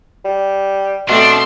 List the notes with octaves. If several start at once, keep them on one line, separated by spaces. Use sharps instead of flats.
G3
B2 A3 C4 D4 C6